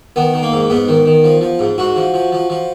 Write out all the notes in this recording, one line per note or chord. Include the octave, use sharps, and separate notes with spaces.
D#3 B3
D#3
A#3
G#2
G#2 B3
D#3
D#3
F3
F3
G#2
G#2 F#4
F3
F3
F3
F3